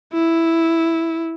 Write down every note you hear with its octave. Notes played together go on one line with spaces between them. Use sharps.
E4